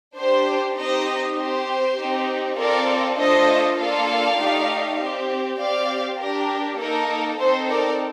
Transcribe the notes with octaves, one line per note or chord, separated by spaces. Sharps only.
D4 G4 C5
C4 D#4 G4 C5 D#5
C4 G4 C5
C4 D#4 G4
C4 F4 A4 A#4 D5
A3 D4 F4 A4 C5 D#5
A#3 D4 F4 A4 D5 F5
A3 D#4 G4
C4 G4
C4 G4 D5 F5
D4 G4 A#4
A#3 D#4 A4 A#4
C4 D#4 A4 C5
A#4 D5